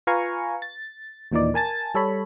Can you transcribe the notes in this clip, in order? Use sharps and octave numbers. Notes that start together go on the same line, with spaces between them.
F4 B4 F5 G#5 A#5 C#6
A6
D#2 A#2 E3 D#4 D5
A#4 G#5 A5 A6
G3 A4 C#5 B5